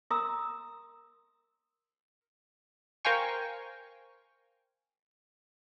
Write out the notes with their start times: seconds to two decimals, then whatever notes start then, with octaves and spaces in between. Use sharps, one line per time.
0.11 A#4 A#5 C6 D#6 E6
3.05 A#4 C5 F5 G5 G#5 C#6